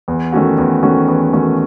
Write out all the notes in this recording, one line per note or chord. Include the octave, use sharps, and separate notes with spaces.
E2
D#3 A3 C#4 F#4
E2
D#3 A3 C#4 F#4
E2
D#3 A3 C#4 F#4